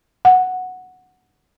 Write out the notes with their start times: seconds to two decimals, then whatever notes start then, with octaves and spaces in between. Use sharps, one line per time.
0.25 F#5